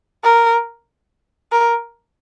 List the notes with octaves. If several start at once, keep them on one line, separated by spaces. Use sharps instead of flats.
A#4
A#4